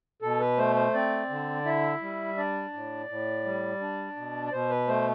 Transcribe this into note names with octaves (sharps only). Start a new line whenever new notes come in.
B2 A4
B4
A3 C5
C5
C4 D5
D3
E4 E5
G3
D4 D5
A2
A2
G3
D4
B2
D5
B2 C5
B4
A3 C5